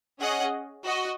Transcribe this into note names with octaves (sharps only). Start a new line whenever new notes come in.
C#4 G#4 D#5 F#5
F#4 D#5